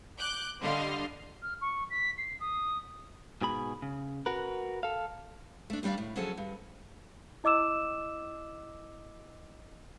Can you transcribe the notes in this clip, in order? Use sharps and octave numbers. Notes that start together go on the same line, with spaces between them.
D6 F#6 G6
D3 G3 D#5 F5 C6
F6
C#6
B6
C7
D#6
G#2 B2 G#4 B5
C#3
F#4 A#4 B4
A4 F5
A3 D4
D#2 G3 D4 D5 F5
A2
D3 F3 F#3 C#4 G#4 A4
G2
E4 D#5 D6 E6 E7